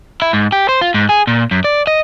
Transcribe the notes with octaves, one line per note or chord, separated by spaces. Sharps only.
E4
G#2
G4
C5
F4
G#2
G#4
A#2
F#2
D5
D#5